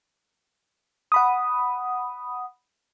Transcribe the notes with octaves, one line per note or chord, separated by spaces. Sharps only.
F#5 B5 D#6